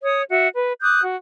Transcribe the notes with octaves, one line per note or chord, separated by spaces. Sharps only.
C#5 D#6
F#4 E5
B4
D6 D#6 F#6 G6
F#4